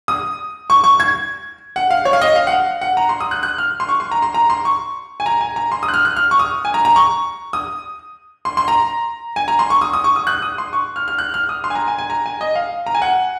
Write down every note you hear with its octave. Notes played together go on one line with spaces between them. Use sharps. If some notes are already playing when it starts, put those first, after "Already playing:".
D#6
C#6
C#6
G#6
F#5
F5
C#5
F5
D#5
F5
F#5
F5
F#5
A#5
C6
D#6
F#6
F#6
F6
C6
C#6
C6
A#5
C6
A#5
C6
C#6
G#5
A#5
G#5
A#5
C6
D#6
F#6
F6
F#6
F6
C#6
D#6
G#5
A#5
A#5
C#6
D#6
C6
C6
A#5
G#5
A#5
C6
C#6
D#6
D#6
C#6
D#6
F#6
D#6
C6
C#6
F6
F6
F#6
F6
D#6
C6
G#5
A#5
G#5
G#5
A#5
G#5
D#5
F5
A#5
G#5
F#5